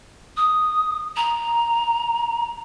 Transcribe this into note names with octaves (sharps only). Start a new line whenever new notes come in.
D#6
A#5